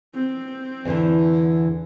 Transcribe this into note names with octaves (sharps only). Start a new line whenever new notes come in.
C4
E2 D3 E3